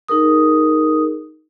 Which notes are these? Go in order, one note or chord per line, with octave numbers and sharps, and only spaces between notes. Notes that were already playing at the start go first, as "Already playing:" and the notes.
D#4 G#4 A#4 D#6